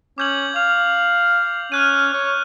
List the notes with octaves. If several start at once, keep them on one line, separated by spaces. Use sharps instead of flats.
C#4 D6 G6 F#7
F5 F7
C#4 F6 F#6 D#7
C#5